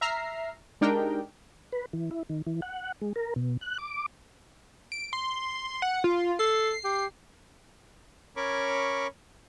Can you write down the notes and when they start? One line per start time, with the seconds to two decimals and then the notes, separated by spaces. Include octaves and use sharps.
0.01 E5 A#5 F6 C7
0.81 G#3 D4 D#4 G4 A#4 G5
1.72 B4
1.93 E3
2.11 E4
2.29 D#3
2.47 E3
2.62 F#5
3.02 G#3
3.16 A#4
3.36 B2
3.61 F#6
3.78 D6
4.92 D7
5.13 C6
5.82 F#5
6.04 F4
6.39 A4 C7
6.84 G4
8.36 C#4 A#4 C#5 B5 C#6 D6